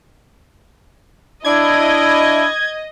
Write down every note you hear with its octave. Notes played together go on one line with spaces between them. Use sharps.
D4 E4 D#5 G#6